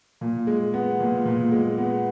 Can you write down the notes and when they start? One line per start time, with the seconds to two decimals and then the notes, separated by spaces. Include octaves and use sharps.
0.21 A#2
0.47 G#3
0.74 B3
1.00 A#2
1.25 A#2
1.52 G#3
1.78 B3